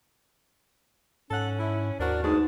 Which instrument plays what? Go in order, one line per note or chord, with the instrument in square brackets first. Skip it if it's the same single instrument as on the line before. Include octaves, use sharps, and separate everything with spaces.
[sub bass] G#2 [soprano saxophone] C#4 [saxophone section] A4 F#5
[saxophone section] E4
[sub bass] D#2 [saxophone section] D4 F#4 A#4 [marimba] C5 [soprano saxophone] D5
[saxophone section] D2 G#2 G#4 [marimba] D#4 B4 [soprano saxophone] A5